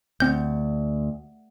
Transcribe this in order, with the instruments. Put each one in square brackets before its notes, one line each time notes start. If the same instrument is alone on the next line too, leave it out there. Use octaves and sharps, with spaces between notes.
[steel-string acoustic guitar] D2 [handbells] C4 G6